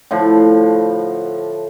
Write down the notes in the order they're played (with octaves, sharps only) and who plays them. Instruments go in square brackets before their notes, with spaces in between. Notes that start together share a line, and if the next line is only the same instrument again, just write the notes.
[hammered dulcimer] A2 D3 F3